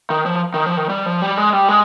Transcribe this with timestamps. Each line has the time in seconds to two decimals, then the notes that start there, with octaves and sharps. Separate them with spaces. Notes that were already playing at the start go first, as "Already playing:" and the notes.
0.10 D#3
0.26 F3
0.54 D#3
0.66 F3
0.77 D#3
0.89 G3
1.06 F3
1.22 G3
1.37 G#3
1.53 G3
1.69 G#3